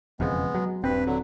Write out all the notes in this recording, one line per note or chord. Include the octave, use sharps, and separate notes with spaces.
E1 F2 C#3 G#3 B3
F#3
D#1 G2 C4 B4
D3 F#3